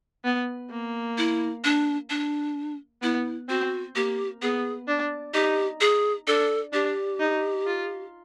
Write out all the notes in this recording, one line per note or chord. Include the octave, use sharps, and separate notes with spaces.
B3
A#3
E4
D4
D4
B3 E4
C4 F#4
A#3 G4
B3 G#4
D4
D#4 G4
G#4
D4 A4
D4 G4
D#4
F4